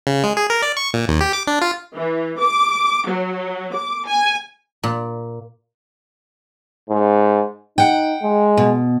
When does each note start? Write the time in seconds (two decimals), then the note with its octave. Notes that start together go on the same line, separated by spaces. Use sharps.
0.07 C#3
0.24 G#3
0.37 G#4
0.50 A#4
0.62 D5
0.77 C#6
0.94 A#2
1.08 D#2
1.21 G4
1.33 D6
1.47 D4
1.62 F4
1.94 E3
2.39 D6
3.07 F#3
3.75 D6
4.07 G#5
4.83 A#2
6.90 G#2
7.78 D#4 F#5 G5
8.22 G#3
8.57 B2